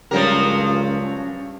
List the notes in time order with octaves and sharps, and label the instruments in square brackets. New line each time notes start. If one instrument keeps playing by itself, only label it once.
[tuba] C#2 [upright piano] G2 G4 [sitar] F3 F#3 A#4 [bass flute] C#4